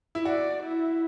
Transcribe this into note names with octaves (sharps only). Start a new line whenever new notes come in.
E4
F#4 D5
E4